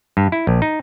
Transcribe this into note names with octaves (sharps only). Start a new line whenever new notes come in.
G2
E4
A#1
D#4